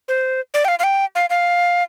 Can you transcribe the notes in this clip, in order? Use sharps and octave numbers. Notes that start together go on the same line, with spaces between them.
C5
D5
G5
F5
F5
G5
F5
F5